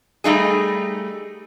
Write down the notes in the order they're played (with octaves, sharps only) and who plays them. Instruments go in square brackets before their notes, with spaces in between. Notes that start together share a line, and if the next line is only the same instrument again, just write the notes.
[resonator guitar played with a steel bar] G3 A3 D#4 G#4